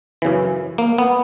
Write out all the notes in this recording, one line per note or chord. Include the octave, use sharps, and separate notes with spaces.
F#2 C#3 E3
A#3
B3